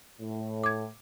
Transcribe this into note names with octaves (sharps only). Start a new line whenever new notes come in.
A2
D6 G#6